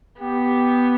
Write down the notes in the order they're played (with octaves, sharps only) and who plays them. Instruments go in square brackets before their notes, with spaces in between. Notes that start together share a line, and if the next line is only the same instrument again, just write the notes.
[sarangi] B3 [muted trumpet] G4